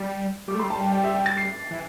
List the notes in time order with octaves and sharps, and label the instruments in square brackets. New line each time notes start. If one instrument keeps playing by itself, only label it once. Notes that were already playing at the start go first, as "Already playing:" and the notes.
Already playing: [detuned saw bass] G3
[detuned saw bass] G3 [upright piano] D6
[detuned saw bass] A3
[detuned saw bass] G3 [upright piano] C6
[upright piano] A5
G5
G5
E5
G5
A6
C7
[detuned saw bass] E3